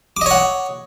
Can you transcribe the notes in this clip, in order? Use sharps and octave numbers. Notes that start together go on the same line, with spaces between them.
C#5 D#5 F#5 D6